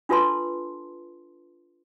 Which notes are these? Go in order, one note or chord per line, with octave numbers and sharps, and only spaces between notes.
D4 F4 A4 B4 A5 C6